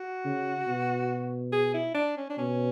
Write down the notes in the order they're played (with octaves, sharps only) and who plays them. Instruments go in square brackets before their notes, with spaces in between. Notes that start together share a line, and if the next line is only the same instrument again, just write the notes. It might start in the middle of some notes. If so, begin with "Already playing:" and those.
Already playing: [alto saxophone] F#4
[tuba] C#3
B2
[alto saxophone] G#4
E4
D4
C#4
D4
[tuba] B2 [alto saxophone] C#4